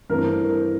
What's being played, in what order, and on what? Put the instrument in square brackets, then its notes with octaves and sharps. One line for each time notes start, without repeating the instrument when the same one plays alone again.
[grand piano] G2 E3 A3 C4 A#4